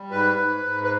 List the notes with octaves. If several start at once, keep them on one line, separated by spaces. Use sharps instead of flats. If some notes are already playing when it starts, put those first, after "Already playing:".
Already playing: G3
G#2 B4
G#2
G#2
B4